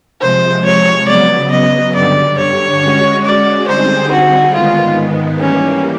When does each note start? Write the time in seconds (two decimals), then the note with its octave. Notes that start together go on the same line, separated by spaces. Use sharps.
0.21 C3 F3 G#3 C5
0.65 C#5
1.08 C#3 F#3 B3 D5
1.51 D#5
1.94 G2 D3 G3 D5
2.38 C#5
2.81 G#3 C#4 F#4
3.25 D5
3.68 D3 G3 C4 D#4 G#4 C5
4.12 F#4
4.54 G#2 D#3 G#3 B3 F4
5.41 E3 G3 A#3 C#4